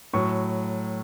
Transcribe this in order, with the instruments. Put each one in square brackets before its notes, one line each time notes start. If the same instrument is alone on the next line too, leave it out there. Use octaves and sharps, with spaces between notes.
[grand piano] A2 F#3 C#6